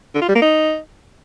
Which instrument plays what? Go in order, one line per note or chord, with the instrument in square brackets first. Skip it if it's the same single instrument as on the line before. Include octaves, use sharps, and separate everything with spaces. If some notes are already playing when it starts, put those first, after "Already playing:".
[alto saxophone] D3
F4
G3
A#3
D#4